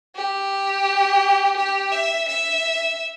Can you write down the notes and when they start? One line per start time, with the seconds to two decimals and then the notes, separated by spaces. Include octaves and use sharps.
0.16 G4
1.57 G4
1.92 E5
2.29 E5